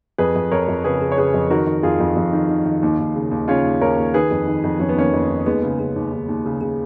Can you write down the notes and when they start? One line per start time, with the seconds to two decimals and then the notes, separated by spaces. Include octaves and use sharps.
0.18 F2 G#4 B4
0.35 F2
0.52 F2 A#4 C#5
0.68 F2
0.84 C#3 G#4 B4
1.01 C#3
1.12 C#5
1.17 C#3 G#4 B4
1.34 F2
1.51 D#3 F#4 A#4
1.67 D#3
1.83 F2 F4 G#4
2.00 F2
2.16 F2
2.33 D#3
2.49 D#3
2.65 D#3
2.82 D#2
2.99 D#2
3.15 C#3
3.31 D#2
3.48 C#3 C#4 F4
3.65 D#2
3.81 D#2 A#4 C#5
3.98 D#2
4.14 D#3 G#4 B4
4.31 F2
4.47 D#3
4.64 F2
4.80 F2 C#4
4.89 B3
4.96 D#3 A#3 C#4
5.13 F2
5.30 D#3
5.46 D#2 G#3 B3
5.63 C#3
5.80 C#3
5.96 D#2
6.12 D#2
6.29 D#2
6.45 C#3
6.61 C#3